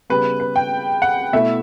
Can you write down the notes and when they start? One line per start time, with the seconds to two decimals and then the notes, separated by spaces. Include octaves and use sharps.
0.10 C#3 G3 B3 B4
0.40 B4
0.56 G5
1.02 F#5
1.33 B2 A3 E4 E5